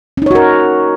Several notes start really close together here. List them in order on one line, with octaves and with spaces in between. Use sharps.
C#4 D#4 C#5 F#4 A#4